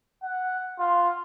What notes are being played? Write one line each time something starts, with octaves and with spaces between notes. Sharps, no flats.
F#5
F4